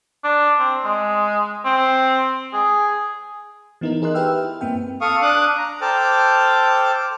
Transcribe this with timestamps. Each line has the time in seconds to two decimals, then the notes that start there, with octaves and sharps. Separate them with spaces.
0.24 D4
0.59 C4
0.84 G#3
1.65 C4
2.53 G#4
3.81 E3 B3 D#4 E4 A#4
4.02 G#4 A#4 D#5 C6 F#6
4.14 G4 B4 E5 G5 E6 F6
4.44 E4
4.61 G2 A#3 C4 G5
5.01 A4 F5 C#6 D#6
5.22 D4 D6 D#6 F#6
5.58 A#5
5.81 A4 C5 G5 A5 D6 F6